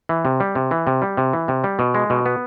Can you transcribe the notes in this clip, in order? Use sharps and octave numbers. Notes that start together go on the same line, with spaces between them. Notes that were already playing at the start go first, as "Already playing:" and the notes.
E3
C3
G3
C3
E3
C3
G3
C3
E3
C3
G3
B2
G#3
B2
B3